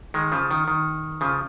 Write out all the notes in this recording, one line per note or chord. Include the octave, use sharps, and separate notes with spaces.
D#3 G#3
C#3 F3
D#3
D#3
C#3 F3